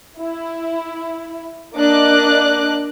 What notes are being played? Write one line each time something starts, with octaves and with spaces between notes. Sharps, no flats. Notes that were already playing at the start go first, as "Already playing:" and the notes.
E4
A#3 D4 D#5 D6 F#6